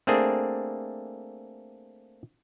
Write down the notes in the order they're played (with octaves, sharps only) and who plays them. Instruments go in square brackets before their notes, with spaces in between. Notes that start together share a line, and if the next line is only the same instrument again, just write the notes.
[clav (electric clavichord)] A3 A#3 C4 D4 G#4